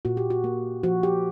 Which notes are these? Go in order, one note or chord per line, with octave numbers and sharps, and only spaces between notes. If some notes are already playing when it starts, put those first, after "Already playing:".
A#2 F#4
G4
F#4
A#3
F3 F#4
G4